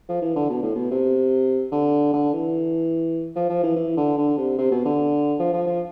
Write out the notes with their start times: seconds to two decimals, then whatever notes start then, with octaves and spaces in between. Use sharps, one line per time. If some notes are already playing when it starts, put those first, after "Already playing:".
0.09 F3
0.22 E3
0.36 D3
0.49 B2
0.62 A2
0.75 B2
0.90 C3
1.72 D3
2.13 D3
2.33 E3
3.36 F3
3.49 F3
3.63 E3
3.76 E3
3.97 D3
4.17 D3
4.38 C3
4.58 C3
4.71 B2
4.85 D3
5.39 F3
5.53 F3
5.67 F3